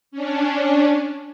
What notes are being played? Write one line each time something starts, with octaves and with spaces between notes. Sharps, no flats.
C#4 D4